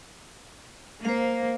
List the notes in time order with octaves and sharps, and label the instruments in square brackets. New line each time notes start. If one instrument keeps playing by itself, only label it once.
[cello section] A#3 [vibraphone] C5 F5